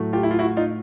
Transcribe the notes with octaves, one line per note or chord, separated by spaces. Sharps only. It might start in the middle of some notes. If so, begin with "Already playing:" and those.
Already playing: A2 F#3 A3
F4 G4
E4
F4
E4 F#4
D#4 F4